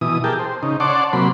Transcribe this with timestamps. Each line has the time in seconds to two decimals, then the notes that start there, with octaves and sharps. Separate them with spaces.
0.01 B2 E3 D#6
0.24 G4 G#4 A#4 G5 A5
0.39 C5
0.63 C#3 D#4
0.80 C#5 D5 F#5 A5 C6 D6
1.13 C3 F#3 A#3 B5 C6